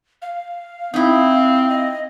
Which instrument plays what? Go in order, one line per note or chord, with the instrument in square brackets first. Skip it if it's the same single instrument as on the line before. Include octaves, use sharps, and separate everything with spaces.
[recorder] F5
[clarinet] C4 [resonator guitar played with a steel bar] D#4 E4 [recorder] F5
[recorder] D#5